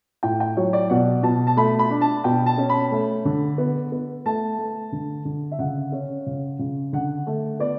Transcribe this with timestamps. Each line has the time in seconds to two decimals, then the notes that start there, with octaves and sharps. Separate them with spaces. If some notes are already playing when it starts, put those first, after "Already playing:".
0.23 A2 G5
0.40 G5
0.57 F#3 C#5
0.73 D5
0.90 B2 F#5
1.23 B2 A5
1.47 A5
1.57 A3 B5
1.79 B5
1.91 D4
2.01 A5
2.24 B2 G5
2.46 A5
2.58 C#4
2.69 B5
2.92 A3
3.25 D3
3.58 B3
3.92 B3
4.26 A3 A5
4.59 A3
4.92 D3
5.25 D3
5.51 E5
5.59 C#3 F#5
5.92 C#4
6.26 C#3
6.59 C#3
6.93 D3 F#5
7.27 A3
7.60 B3 D5